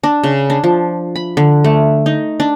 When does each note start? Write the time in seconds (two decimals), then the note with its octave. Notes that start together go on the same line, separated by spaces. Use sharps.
0.04 D4
0.24 C#3
0.50 D4
0.64 F3
1.15 B5
1.37 D3
1.64 A3
2.06 D#4
2.40 D4